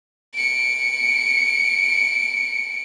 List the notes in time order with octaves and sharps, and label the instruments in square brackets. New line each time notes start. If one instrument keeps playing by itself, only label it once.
[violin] C#7 D7